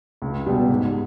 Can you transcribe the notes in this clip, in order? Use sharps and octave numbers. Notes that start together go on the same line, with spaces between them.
C#2
B2 G3 B3 G4
G#2